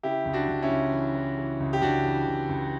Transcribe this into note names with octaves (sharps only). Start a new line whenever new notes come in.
C#3 E4 G4
C#2
D4 F#4
C#2
C#4 E4
C#2
E3
E3
E3
C#2
G4
C#2 D4 F#4
E3
C#2
C#2